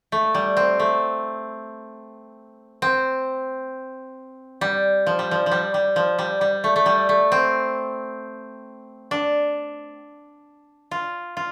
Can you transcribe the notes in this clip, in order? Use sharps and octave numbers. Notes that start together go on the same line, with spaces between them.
A3
G3
C4
A3
C4
G3
F3
G3
F3
F3
G3
G3
F3
G3
G3
A3
A3
G3
A3
C4
D4
F4
F4